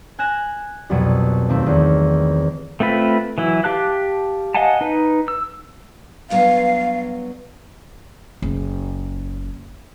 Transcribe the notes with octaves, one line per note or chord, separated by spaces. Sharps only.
G#5 F#6 A#6 E7
C2 F2 B2 F#3 D#7
D#2 A3 C4
E2 D#3
A3 C4 F4 B4
E3 F#3 E4
G4 F5 A5 F#6
D#5 F5 F#5 G#5 A5
D#4 B4
E6
G2 F#3 B3 F5
F#1